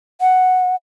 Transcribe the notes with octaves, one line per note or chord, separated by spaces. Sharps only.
F#5